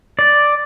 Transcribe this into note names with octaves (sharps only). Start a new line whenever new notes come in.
D5